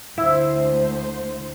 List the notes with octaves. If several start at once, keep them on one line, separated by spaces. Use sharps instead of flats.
D2 E4 C5